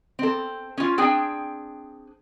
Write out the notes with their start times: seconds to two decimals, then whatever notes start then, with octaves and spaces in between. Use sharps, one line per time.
0.19 C4 A4
0.78 C#4 F4
0.98 C4 D4 G#4 G5